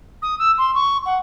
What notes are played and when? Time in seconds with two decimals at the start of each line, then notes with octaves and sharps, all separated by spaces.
0.22 D#6
0.38 E6
0.58 C6
0.74 C#6
1.05 F#5